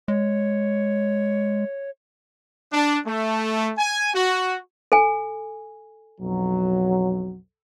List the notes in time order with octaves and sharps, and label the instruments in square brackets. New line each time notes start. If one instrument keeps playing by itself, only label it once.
[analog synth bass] G#3 [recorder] C#5
[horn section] D4
A3
G#5
F#4
[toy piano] A4 G#5
[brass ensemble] B1 F2 F#3